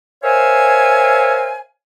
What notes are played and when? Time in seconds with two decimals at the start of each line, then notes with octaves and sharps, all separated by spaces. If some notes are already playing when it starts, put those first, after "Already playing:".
0.24 A#4 C5 C#5 E5 F5 G#5